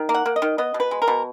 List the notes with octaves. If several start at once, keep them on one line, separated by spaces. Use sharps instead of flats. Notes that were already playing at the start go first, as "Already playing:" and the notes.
Already playing: D#3
A#3
F#5
A#3
D#5
D#3
B3 D#5
B2
B4
G#3
A#4
B2